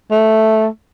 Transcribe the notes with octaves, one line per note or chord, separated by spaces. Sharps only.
A3